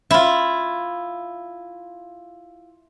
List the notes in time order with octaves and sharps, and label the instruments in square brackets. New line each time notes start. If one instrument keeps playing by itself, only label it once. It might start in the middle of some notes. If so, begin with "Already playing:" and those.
[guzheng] E4 F4